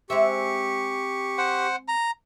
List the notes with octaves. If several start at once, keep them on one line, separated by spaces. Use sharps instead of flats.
G#3 C4 G4 E5 C#6
C5 F#5
A#5